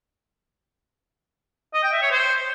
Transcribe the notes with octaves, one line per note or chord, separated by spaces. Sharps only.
D#5
G5
E5
C#5
C5